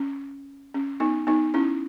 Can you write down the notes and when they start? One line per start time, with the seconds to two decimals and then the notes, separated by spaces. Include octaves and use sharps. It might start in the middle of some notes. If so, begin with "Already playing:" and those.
Already playing: C#4
0.74 C#4
1.00 B3 D#4
1.27 B3 D#4
1.54 C#4 E4